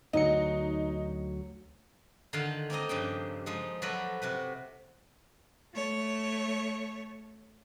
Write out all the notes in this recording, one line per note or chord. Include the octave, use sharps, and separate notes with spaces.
D2 F#3 D#4 D#5 C#7
D3 D#3 F4 F5 G5 A5
A#3 C4 D#4 D#5
G2 C#3 F3 G4 G5
F3 G#3 D#4
F3 F#3 F#4 A4 B4 D5
C3 F#4 B4
A3 C#5